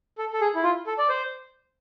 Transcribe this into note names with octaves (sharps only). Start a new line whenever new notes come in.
A4
A4
G#4
E4
F4
A4
D5
C5